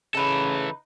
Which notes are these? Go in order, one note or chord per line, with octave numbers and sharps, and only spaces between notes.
C#3 E3 D#4 A4 B4